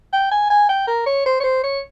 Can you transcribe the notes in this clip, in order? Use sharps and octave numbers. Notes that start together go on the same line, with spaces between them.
G5
G#5
G#5
G5
A#4
C#5
C5
C#5
C5
C#5